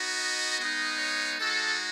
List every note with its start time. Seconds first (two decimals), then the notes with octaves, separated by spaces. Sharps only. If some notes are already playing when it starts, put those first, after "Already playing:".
Already playing: B3 D#4 F#4
0.18 D#5
0.57 G#3 B3 D#4
0.97 C#5
1.38 G#3 D#4 F#4 A4